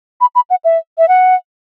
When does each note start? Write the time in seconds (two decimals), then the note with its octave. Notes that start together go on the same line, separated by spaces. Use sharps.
0.21 B5
0.35 B5
0.50 F#5
0.64 E5
0.98 E5
1.08 F#5